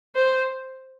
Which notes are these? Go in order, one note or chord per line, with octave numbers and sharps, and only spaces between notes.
C5